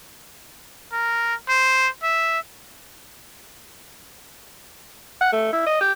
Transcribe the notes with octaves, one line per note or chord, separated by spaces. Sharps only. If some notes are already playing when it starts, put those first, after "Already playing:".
A#4
C5
E5
F#5
A3
E4
D#5
G4